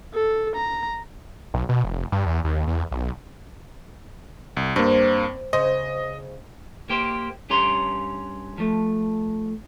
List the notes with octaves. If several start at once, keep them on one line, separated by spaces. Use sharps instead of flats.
A4
A#5
B1
B2
F1
G2
E2
D#2
E2
B1
C2
G2 A#3 C4
C#3 C5 D#5
A#3 G4 C5
G2 C#4 G4 A#5 C6
F3 A3